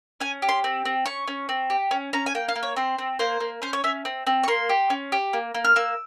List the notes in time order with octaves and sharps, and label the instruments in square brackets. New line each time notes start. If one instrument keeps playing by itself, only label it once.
[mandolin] C#4 G#5
G4
C6
C4
C4
C#4 C#6
C#4
C4
G4
C#4
C#4 A#5
G#5
A#3 G5
F5
A#3
C#5
C4 C5
C4
A#3 C5
A#3
C#4 C5
C#5
C#4 E5
C4
C4
C#6
A#3 C6
G4
C#4
G4
A#3
A#3
F6
A#3 E6